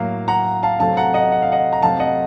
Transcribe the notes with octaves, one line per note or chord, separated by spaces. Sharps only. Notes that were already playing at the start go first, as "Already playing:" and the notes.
Already playing: A2 F#3 A#3 F5
F#5 A#5
F5 A5
C3 F#3 A3 C4 F5 A5
F#5 A#5
D#5 F#5
F#5
F5
D#5 F#5
A#5
C3 F#3 A3 C4 F5 A5
D#5 F#5